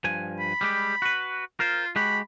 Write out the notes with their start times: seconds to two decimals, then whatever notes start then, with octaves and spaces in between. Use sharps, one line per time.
0.04 G2 F3 G#5
0.40 B5
0.61 G3 G#3 G4
1.02 F#4 B4
1.60 F4 A#4 C5
1.96 G#3 F#4 G4 B5